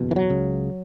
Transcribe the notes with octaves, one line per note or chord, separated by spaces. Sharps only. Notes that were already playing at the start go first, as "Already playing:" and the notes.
Already playing: F#1 E2 B2
E3
F#3
C#2 C#3